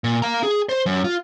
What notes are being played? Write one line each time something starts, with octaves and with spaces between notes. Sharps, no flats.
A#2
F5 A#5
G#4
C5
F#2
F4